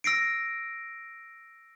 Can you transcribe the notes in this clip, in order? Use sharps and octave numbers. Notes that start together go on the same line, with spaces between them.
E6 A#6 C7 D7